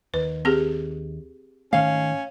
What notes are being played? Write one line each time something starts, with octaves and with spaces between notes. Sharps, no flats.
D#2 B4
C4 G4 G#4
G#2 D#3 A3 C#4 F5